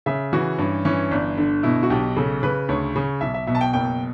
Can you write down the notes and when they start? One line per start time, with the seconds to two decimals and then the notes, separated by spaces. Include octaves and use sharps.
0.06 C#3 E5
0.33 E3 F#4
0.58 G2 C#4
0.85 E3 C#4
1.11 G1 D4
1.37 D3
1.63 B2 E4
1.83 F#4
1.90 B1 G4
2.17 C#3 A4
2.43 C#3 B4
2.69 D2 C#5
2.96 C#3
3.21 B1 E5
3.34 E5
3.47 B2 E5
3.55 A5
3.61 G5
3.73 F#1 G5